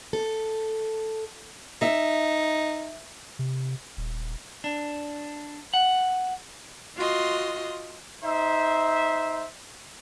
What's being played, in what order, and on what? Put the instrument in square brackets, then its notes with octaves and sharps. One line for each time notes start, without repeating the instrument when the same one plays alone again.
[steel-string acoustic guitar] A4
[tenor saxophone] D#4 [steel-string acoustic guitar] E5
[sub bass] C3
D#1
[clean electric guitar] D4
F#5
[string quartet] F4 F#4 D#5 C6
[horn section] D#4 C5 E5